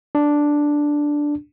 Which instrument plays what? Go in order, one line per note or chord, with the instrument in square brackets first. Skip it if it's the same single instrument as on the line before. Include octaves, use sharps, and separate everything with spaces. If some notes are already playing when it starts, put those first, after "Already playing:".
[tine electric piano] D4